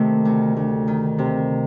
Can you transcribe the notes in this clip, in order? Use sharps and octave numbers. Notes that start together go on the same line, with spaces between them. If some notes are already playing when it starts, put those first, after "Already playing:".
Already playing: C3 D#3 A3
D2
D2
D#3
C3